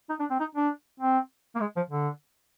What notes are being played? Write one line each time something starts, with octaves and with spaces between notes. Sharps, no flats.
D#4
D4
C4
D#4
D4
C4
A#3
G#3
F3
D3